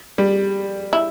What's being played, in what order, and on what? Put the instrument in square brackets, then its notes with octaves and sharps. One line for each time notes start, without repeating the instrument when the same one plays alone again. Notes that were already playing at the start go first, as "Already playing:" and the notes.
[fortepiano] G3
[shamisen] E4